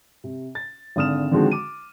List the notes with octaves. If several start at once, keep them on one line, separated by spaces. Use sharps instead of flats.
C3
A6
G#1 D3 D#6 F6 E7
D3 D#3 F3 G#3 C4 F#4
D6 D#7